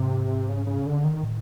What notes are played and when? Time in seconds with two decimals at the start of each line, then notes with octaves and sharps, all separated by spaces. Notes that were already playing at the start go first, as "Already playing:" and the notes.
Already playing: G#2 C3
0.49 C#3
0.67 C#3
0.86 D3
1.04 D#3
1.23 A2